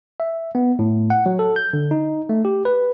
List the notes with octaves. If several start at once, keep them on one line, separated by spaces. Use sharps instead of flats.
E5
B3
A2
F#5
F#3
A4
G6
D3
D#4
A3
G4
B4